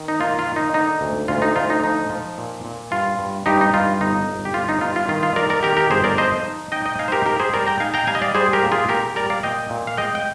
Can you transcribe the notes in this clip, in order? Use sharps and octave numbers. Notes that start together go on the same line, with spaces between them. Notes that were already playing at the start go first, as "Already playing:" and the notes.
Already playing: D#3
D#4
A#3 F4
F4
D#3
D#4
D3 D#4
D2
D2 F4
D#4
D2 F4
D#4
F3 D#4
F3
A#2
A#2
G2 F4
G2
G2 D#4 G4
D#4
G2 F4
G1 D#4
G1
G4
G1 F4
D#4
G2 F4
F4
D#3 F4
F4
D#3 A#4 D5
A#4 D5
D#3 G4 A#4
G4 A#4
G1 G#4 C5
A#4 D5
F3 C5 D#5
D#4
D#4 D#5 G5
D#5 G5
D#4 F5 G#5
C5
G4 A#4
D#4 G4 A#4
G#4 C5
G3 A#4 D5
G5 A#5
D#4 F5 G#5
G5 A#5
G3 F5 G#5
D#5
D5 F5
G3 G#4 C5
G4 A#4
A#2
F4 G#4
A#2 G4 A#4
G3 A#4 D5
D5 F5
A#2 D#5 G5
A#2
F5
G#3 D#5 G5
G5